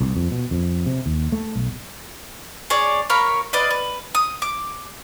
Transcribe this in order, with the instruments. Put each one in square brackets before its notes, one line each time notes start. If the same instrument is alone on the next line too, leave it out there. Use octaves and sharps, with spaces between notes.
[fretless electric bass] C2
F2
B2
F2
C3
D#2
A3
B1
[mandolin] G#4 C#5 D5
A#4 C#5 F5 B5
B4 D5 D#5 F5
B4
D#6
D6